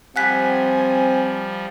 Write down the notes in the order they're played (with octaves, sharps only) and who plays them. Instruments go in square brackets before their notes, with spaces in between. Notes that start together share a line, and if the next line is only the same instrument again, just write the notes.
[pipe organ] F3 G3 [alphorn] C4 [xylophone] F#5 F#6 B6 [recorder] G#5